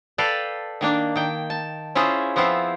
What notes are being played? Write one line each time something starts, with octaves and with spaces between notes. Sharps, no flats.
A4 B4 D5 F5 G5 A5
D#3 A#3 D4
D#3 G5
A5
C#4 E4 F4 G#4 C5
F3 B3 C4 E4 F4